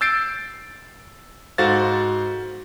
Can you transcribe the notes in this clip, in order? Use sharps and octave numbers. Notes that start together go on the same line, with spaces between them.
E6 G6 A6 C7 D7
G#2 F#4 A4 C5 F5 A6